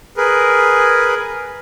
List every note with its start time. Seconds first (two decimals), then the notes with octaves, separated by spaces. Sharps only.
0.17 G#4 A#4 B4